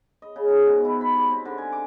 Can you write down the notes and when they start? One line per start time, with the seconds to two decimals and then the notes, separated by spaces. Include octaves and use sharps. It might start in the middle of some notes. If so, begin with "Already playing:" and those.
0.22 D#5
0.36 C#3
0.48 G#2
0.66 B2
0.85 E4
1.01 B5
1.16 G3
1.30 C4
1.45 D3
1.58 G#5
1.72 D6